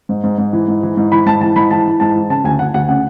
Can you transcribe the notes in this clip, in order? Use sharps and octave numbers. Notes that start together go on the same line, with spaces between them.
G#2
G#2
G#2
E3
G#2
E3
G#2
E3 B5
G#2 A5
E3 A5
G#2 B5
E3 A5
E3
G#2 A5
E3
C#3 A5
D2 G#5
D2 F#5
D2 F#5
C#3 F#5